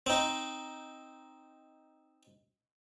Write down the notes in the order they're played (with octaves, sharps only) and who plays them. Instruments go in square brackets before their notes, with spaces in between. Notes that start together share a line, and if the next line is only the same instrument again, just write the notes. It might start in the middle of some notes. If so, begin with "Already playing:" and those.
[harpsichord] C4 D#4